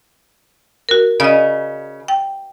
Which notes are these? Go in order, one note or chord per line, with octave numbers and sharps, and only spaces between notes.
F#4 A#4
C#3 D5 D#5
G5